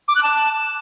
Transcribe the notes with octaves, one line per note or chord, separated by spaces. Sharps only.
D6
F#6
A5